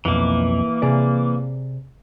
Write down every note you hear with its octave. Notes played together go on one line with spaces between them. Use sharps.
B1 F2 E3 A#3
C3 G#4 D5